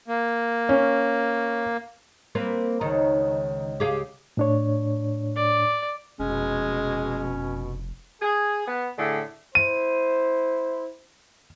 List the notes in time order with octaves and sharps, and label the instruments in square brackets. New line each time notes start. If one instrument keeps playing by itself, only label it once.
[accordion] A#3
[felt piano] C#4
[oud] A#3 C4 B4
[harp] C#2 [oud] D#3
[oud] G4 G#4 F5
[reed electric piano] A2 D4 C#5
[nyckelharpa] D5
[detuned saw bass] F1 [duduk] B2 [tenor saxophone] G#3 [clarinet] C#4
[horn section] G#4
B3
A2 D3 A3 G#4
[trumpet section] E4 C5 [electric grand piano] D#7